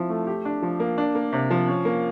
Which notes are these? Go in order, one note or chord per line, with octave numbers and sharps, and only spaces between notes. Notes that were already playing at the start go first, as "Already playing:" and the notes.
Already playing: F3 C4 E4
A3
G4
D4
F3
A#3
D4
A#3
C3
F3
C#4
A#3